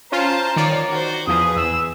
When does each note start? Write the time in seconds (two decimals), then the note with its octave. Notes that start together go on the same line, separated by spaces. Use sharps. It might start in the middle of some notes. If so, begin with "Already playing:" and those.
0.12 C#4 F4 C5 A5 A#5
0.56 D#3 F4 C#5 D5
0.90 F#4 C5
1.27 E2 F3 G#4 B4 D#6
1.56 E2 E6